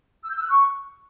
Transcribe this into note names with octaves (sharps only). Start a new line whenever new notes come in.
E6
G6
E6
F#6
C#6